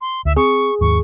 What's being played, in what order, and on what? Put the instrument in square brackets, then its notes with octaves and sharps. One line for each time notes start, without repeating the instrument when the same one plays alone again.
[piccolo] C6
[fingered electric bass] D2 [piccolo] E5
[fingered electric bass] C4 [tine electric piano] G#4 [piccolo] C#6
[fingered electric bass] D#2 G#2 [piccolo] C#6